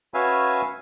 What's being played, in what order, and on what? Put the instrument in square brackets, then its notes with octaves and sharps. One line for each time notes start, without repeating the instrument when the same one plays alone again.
[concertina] C#4 F#4 B4 E5 F5 G#5